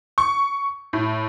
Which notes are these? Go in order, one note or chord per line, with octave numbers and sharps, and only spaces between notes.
C#6
A2